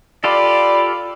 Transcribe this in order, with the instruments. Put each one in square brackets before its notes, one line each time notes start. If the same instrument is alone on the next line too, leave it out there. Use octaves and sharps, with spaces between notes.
[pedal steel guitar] F4 G4 A4 [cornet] D5 [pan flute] B5